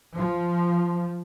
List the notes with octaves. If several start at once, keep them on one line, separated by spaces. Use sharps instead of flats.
F3